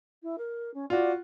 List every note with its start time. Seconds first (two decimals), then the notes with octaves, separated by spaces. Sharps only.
0.23 E4
0.38 A#4
0.74 C#4
0.90 F4 F#4 D5